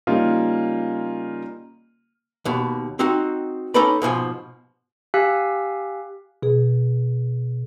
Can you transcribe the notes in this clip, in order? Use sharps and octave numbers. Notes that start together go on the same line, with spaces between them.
C#3 G3 A#3 D#4 F4
D#2 B2
C4 D#4 F#4 C6
C#4 D#4 A4 B4 D5 B5
G#2 B2 F3 G#5
G4 F5 G#5 E6 F#6 B6
B2 G#4